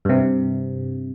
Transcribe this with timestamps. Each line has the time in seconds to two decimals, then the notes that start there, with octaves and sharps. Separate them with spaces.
0.05 G2 C3